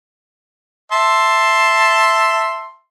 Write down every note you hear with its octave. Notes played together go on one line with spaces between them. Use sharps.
E5 A5 C6